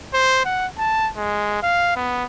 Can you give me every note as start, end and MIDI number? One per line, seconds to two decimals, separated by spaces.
0.14 0.44 72
0.45 0.67 78
0.78 1.10 81
1.17 1.58 56
1.63 1.96 77
1.96 2.25 59